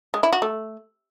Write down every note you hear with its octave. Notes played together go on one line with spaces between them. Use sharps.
G#3
E4
F#4
A3